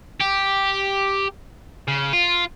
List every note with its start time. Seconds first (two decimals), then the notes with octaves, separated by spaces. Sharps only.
0.20 G4
1.88 C#3
2.13 F4